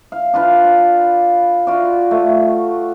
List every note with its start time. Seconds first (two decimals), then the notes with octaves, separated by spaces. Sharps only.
0.12 F5
0.33 D4 F4 B4
0.65 D5
1.67 F4 F#4 D5
2.11 A3